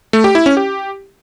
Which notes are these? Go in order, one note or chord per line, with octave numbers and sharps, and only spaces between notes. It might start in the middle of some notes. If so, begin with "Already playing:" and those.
A3
G4
E4
C#4
G4